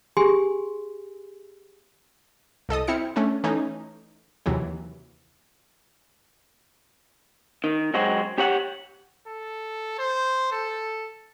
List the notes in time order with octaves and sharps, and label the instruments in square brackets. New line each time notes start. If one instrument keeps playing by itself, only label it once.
[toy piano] G4 G#4 G#5 C6
[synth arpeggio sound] C2 A4 D#5 D#6
C4 E4 F6 C#7
A3 C#4 D4
E3 A3 C#4 D#4
D#2 C3 E3 F#3
[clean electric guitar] D#3
F#3 G#3 C4 F#4
G4 C#5 F#5
[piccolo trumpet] A4
C5
A4